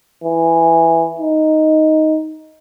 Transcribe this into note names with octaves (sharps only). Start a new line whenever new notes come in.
E3
D#4